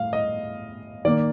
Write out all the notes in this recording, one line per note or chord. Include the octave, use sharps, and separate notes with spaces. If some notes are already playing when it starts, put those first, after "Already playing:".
Already playing: A2 F5
D#5
D#3 A#3 D5